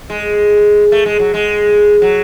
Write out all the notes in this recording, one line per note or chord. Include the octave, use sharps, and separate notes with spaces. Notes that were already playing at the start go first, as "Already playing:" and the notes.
G#3
A3
G#3
F#3
G#3
F#3